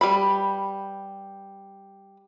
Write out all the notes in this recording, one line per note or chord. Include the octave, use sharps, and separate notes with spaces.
G3 B4 B5